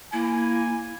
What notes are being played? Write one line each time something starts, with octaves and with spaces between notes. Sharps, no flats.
A#3 E4 G#5